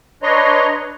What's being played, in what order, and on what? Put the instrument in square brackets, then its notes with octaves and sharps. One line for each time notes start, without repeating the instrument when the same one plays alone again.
[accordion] D4 B4 C#5 D#5 A#5 C6